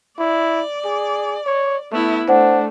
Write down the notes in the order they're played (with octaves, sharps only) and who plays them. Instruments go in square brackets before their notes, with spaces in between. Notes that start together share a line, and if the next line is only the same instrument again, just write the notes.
[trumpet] E4 [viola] D5
[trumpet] G#4
C#5
[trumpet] A3 [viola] B3 E4
[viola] A3 [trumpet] D4 [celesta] C5 F#5